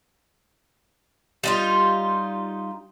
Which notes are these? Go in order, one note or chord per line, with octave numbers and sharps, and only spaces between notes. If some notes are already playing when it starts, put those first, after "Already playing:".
G3 D#4 F4